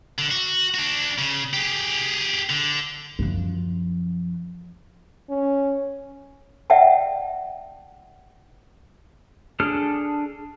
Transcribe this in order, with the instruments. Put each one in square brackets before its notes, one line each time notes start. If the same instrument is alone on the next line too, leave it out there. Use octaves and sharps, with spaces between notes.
[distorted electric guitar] D3
F#4
D4 F#4
C#3
G4 G#4
D3
[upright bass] F#2 F3
[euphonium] C#4
[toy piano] D5 E5 F#5 G5 A5
[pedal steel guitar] D4 G#4 A4 F6